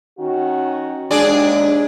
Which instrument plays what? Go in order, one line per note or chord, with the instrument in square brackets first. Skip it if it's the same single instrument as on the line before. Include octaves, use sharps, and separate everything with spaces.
[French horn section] D#3 C#4 F#4
[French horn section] D#2 G#3 [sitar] D4 G#4 D5